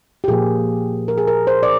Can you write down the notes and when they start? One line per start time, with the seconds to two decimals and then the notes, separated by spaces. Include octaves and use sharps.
0.24 G4
0.28 A#2 F3 A#3 G#4
1.08 A#4
1.18 G#4
1.27 A#4
1.47 C5
1.63 D5